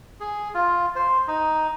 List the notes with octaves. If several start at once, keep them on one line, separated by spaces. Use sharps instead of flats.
G#4
F4
C5
D#4